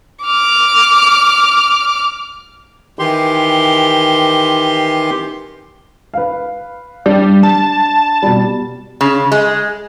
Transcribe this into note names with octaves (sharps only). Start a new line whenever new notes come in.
D6 F6
D#3 E3 G4 C6
B4 F5
G3 D4
A5
B2 G3
C#3
G#3